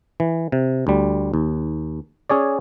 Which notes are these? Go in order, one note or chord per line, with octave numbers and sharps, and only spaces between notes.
E3
C3
D2 G3
D#2
C#4 G#4 C#5 D5